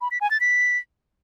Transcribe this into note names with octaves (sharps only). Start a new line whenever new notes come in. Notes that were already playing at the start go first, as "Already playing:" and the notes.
B5
B6
G#5
A6
B6